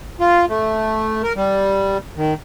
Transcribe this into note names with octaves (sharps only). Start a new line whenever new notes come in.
F4
A3
A#4
G3
D#3